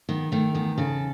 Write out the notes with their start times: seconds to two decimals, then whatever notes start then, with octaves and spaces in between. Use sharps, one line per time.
0.09 D#3 B3
0.32 D#3 A3
0.54 E2 B3
0.78 C#3 A4